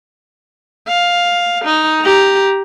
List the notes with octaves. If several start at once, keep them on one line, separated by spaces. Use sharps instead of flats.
F5
D#4
G4 A#5